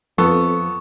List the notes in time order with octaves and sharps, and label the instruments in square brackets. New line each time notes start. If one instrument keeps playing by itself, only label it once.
[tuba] F2 [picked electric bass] F3 [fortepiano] B3 A4 [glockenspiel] C#6